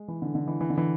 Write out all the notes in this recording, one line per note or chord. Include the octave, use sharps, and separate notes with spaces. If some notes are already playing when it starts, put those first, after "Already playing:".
Already playing: G#3
E3
D3
D3
E3
E3
D3
E3